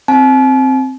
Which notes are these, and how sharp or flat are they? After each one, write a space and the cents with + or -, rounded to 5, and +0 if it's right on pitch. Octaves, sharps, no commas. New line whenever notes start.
C4 +0 A5 -45